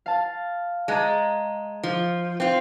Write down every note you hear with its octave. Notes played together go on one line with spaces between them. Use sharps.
F5 A5
G#3 D#5 A5 A#5
F3
C4 F4